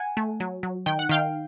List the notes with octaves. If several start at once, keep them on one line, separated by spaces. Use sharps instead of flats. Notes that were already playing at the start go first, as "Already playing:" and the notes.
Already playing: F#5 G#5
A3
F#3
F#3
D#3 G5
F#5
D#3 F5 G5